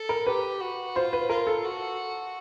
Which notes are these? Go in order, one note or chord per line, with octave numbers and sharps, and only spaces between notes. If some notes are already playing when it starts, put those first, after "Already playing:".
Already playing: A4
A#4
G4 B4
F#4
F4 C5
B4
F4 A#4
A4
F#4